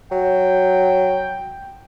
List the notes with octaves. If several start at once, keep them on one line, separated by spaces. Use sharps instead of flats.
F#3 G5